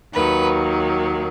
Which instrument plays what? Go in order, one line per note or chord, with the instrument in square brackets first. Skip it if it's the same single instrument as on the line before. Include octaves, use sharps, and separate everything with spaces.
[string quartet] D#2 D#3 F#3 B4